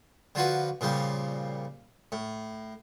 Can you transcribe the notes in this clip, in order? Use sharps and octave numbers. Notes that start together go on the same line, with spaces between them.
D3 F3 F4 F#4 B4
A#2 C#3 F3 G3
A2